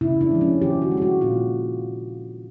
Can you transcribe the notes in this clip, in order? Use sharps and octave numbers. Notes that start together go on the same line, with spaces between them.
C#3 E4
D4
F3 G#3
C#4
D#3 G4
F#4
G#3
G4
F#4
A#2 F4